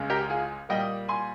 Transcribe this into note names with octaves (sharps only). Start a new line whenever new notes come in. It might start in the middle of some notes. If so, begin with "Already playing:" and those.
Already playing: C#2 C#3 G#3
G4 A#4
F4 G#4
A#2 G3 A#3 D#5 G5
G#5 C6